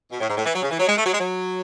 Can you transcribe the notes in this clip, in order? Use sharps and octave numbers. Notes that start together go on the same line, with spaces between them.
B2
A2
G#2
A2
E3
F#3
C#3
E3
F#3
G#3
A3
F#3
G#3
F#3